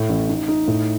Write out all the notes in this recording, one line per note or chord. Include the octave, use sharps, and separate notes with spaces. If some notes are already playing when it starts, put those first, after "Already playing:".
Already playing: A2 A3
A1
D#4
D#4
A2